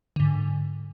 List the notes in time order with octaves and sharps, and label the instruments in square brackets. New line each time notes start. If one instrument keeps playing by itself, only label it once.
[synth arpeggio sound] G#2 D3